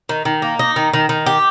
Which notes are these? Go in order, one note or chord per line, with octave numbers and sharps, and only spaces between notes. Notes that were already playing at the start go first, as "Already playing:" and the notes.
D#3
D#3
A#3
D#4
D#3
D#3
D#3
G4